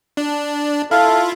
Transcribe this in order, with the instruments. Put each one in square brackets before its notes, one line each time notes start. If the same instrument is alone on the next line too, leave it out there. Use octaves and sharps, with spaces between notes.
[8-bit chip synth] D4
[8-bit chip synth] E4 F4 [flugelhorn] A4 [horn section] F5